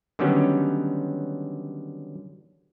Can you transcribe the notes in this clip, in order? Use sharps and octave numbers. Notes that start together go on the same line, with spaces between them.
D3 D#3 F#3 G3 B3 C#4